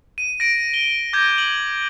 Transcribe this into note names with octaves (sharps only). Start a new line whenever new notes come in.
D#7
A#6 D7
G7
D6 G6 G#6 A#6
F#7